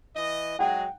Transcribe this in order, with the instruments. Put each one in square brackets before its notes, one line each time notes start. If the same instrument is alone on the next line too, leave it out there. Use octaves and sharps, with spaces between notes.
[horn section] E3 D#5
[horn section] F#3 G#3 G#4 [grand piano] F#5 G5